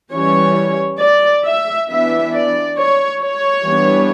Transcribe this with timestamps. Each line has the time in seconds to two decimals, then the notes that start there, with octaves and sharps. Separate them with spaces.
0.12 E3 G3 C#4 C#5
1.00 D5
1.45 E5
1.89 E3 B3 D4 E5
2.33 D5
2.78 C#5
3.22 C#5
3.66 E3 G3 B3 D4